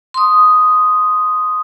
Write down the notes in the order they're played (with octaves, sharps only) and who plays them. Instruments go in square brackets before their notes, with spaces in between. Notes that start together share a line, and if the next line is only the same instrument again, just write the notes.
[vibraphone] C6 D#6